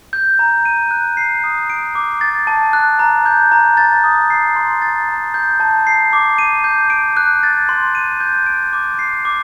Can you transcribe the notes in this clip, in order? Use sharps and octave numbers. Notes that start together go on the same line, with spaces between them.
G6
A#5
D#7
F#6
C7
D#6
D7
D6
A6
A5
F#6
A#5
G6
A#5
A6
D#6
C7
C6
A6
A#5
G6
A5
C7
D6
D#7
G6
D7
F#6
A6
C6
D#7
G6
D7
D6
C7
D6